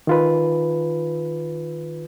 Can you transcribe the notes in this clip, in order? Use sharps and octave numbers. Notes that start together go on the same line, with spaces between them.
D#3 F4 B4